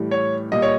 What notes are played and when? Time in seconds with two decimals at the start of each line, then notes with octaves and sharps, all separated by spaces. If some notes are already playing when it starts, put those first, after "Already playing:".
Already playing: A2 E3 G3
0.11 C#5
0.52 A#2 G3 D#5
0.62 C#5